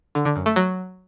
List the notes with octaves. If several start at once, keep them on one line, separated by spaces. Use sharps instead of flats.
D3
D3
F#2
A3
F#3